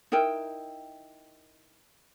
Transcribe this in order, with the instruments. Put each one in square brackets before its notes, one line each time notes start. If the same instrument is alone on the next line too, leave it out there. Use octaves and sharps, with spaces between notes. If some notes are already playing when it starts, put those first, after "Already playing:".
[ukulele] D#4 E4 A#4 G5